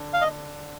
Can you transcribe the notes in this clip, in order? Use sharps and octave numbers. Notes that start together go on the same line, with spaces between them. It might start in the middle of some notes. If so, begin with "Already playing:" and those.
Already playing: D3
F5
D#5